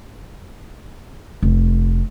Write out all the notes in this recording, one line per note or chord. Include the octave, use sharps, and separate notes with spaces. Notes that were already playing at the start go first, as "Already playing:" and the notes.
F1